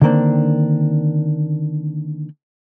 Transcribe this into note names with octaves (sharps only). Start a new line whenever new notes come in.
D3 D#3 G3 A#3 C4 D4